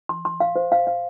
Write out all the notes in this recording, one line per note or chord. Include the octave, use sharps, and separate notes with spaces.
C6
C6
F5
C5
F5
F5